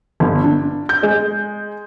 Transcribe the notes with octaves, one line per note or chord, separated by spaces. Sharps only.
G1
D4
G6
G#3